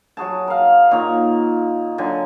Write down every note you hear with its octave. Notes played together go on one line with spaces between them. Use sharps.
F#3 F#4 G#4 A5
A#4 F5
A#2 D#4 C#5 A#5
D3 F#3 G#5